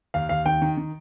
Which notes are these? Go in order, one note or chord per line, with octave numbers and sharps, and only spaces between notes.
D#2 F5
D#2 F5
D#3 G5
D#3
D#3